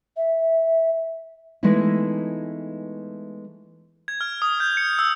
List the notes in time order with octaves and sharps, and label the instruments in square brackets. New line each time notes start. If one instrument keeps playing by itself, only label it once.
[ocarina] E5
[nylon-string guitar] E3 G#3 A3 B3 D#4 E4
[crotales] G#6
F6
D#6
G6
C#7
E6